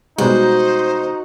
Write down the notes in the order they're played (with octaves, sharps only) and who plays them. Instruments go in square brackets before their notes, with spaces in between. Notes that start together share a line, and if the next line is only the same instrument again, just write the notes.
[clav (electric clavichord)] B2 G3 G#3 [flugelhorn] D#4 [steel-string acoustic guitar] F#4 [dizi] C5